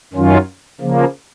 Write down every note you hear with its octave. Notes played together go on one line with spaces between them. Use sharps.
F#2 D#3 F#3 C#4 F4
C#3 F3 A#3